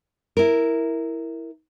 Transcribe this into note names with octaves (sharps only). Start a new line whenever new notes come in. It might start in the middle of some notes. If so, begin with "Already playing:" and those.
E4 A#4